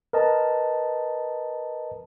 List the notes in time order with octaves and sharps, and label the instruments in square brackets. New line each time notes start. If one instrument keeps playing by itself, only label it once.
[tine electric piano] A#4 B4 D#5 A5